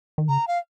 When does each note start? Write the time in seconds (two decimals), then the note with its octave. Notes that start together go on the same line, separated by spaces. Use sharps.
0.18 D#3
0.29 C#3 A#5
0.48 F5